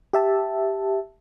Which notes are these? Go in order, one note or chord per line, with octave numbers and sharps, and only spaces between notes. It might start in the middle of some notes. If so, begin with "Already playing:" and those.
G4 E5 A5